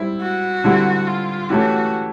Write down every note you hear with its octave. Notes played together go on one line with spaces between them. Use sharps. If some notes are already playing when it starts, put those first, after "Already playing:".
Already playing: G3 C4 E4
F#4
D3 G3 C4 E4
F4
E3 A3 C#4 E4 F#4 G4